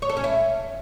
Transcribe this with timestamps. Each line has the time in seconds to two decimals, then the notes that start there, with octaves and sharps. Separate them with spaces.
0.02 C#5
0.09 A4
0.17 C#4
0.24 E4